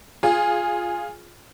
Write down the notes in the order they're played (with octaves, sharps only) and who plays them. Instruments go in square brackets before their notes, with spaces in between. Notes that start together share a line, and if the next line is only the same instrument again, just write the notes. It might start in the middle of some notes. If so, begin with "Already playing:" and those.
[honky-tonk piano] F4 G#4